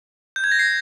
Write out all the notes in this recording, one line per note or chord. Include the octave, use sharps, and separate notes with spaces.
G6
G#6
A#6
C7